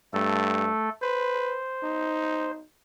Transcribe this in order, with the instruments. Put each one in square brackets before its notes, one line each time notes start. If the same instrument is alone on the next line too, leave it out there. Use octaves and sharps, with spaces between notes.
[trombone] G2 [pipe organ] A3 A4
[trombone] B4 [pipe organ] C5
[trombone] D#4